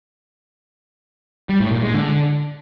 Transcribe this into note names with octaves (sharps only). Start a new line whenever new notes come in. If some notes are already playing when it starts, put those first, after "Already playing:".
G3
A2
A#2
G#3
D3